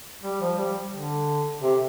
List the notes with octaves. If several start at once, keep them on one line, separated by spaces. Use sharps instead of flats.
G3
F3
G3
D3
C3